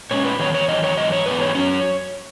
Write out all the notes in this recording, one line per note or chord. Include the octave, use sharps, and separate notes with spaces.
A#2 G#3 C#4 C#5
B4
E2 D#3 F#3 C#5
C#5
E2 D#3 F#3 D#5
C#5
G#2 E3 D#5
C#5
G#2 E3 G#3 B3 B4
C#5
F#3 C#4 C#5